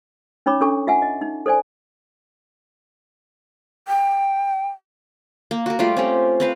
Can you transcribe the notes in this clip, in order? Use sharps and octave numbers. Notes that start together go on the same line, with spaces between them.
C#4 D#4 C#5 B5 D6
C#4 D4 A4 C#6
F4 E5 F#5 G#5
D#5
D#4
A4 C5 D5 G#5
G5
A#3
F#4 A#4
G3 A3 F4 G4
C4 C#4 G4
C4 B4 F5